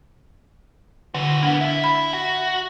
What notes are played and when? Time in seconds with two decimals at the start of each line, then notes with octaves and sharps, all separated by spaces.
1.14 D3 E3 F#4
1.42 A#3 B3 D4 F#5
1.61 E4 E5
1.84 B5
2.13 F#4